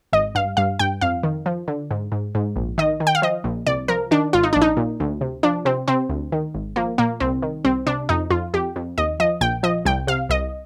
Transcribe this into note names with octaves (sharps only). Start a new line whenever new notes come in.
G#1 D#5
G2 F5
G2 F5
G2 G5
F2 F5
D#3
F3
D3
G#2
G#2
G#2
A#1
D#3 D#5
D#3
G5
F5
F3 D#5
A#1
C2 D5
F3 A#4
D#3 D4
G#1 F4
D#4
A#1 D4
D#4
A#2
D2
C3
F3 D4
C3 C4
C3 C4
D2
D#3
G#1
F3 A#3
A#2 A#3
C2 C4
D#3
C2 C4
C3 D4
F2 D#4
F2 F4
F2 G4
F2
D#2 D#5
F3 D#5
A#1 G5
F3 D#5
C2 G5
C3 F5
C2 D#5